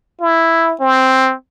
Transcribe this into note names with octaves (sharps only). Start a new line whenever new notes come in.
E4
C4